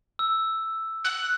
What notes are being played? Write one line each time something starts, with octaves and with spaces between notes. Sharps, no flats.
E6
F#6